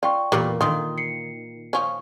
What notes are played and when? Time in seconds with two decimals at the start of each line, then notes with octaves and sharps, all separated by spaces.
0.03 F4 D5 G5 C#6
0.32 E2 A#2 G3 A#4
0.61 A#2 D#3 F4 D#6
0.98 C7 C#7
1.73 F3 C#4